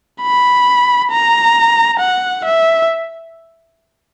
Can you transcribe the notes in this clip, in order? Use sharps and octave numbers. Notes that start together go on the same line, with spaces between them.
B5
A#5
F#5
E5